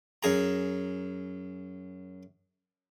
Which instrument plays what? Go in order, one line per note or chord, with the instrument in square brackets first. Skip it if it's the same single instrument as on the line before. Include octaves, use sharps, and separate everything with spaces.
[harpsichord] F#2 G#4 A#5